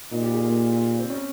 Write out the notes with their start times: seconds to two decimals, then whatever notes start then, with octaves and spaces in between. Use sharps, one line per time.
0.12 A#2 D#4
0.22 G4
0.33 G#4
0.45 A#3
0.99 C4
1.10 C#4